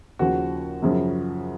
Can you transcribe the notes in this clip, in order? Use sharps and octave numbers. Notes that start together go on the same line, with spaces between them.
D#2 C#3 F3 F#4
F#2 C#3 F3